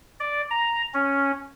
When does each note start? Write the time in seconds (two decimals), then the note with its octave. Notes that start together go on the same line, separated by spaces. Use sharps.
0.20 D5
0.51 A#5
0.94 C#4